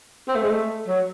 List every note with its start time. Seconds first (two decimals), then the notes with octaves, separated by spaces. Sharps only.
0.28 C4
0.35 A3
0.42 G#3
0.49 A3
0.88 F#3